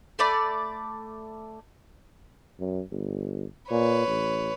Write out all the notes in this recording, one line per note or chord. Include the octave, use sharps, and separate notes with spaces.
A3 D5 B5
F#2
G1
A#2 B4 C#5
A1